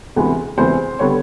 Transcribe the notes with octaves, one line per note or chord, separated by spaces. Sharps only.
D2 C3 E3 G#3 B3
D2 C3 E3 G#3 B3 C5
D3 G3 B3 C#5